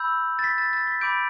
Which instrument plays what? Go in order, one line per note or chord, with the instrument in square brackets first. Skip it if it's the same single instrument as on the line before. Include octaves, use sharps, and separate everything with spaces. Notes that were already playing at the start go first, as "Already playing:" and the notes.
Already playing: [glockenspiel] B5 E6 G6
A6
B6
A6
A6
B6
B5 D6 G6 D7